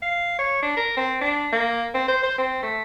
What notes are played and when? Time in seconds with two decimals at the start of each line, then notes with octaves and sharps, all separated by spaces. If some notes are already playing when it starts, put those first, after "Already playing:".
0.02 F5
0.39 C#5
0.62 D4
0.77 A#4
0.97 C4
1.21 D4
1.52 A#3
1.95 C4
2.08 C5
2.23 C5
2.38 C4
2.63 A3